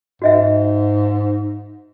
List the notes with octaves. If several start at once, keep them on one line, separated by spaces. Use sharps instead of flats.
G#2 F#4 D#5 E5